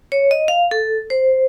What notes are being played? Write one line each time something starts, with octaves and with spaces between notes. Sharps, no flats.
C#5
D#5
F5
A4
C5